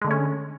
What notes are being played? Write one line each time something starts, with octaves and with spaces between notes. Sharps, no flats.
D3 G#3 A3 C#4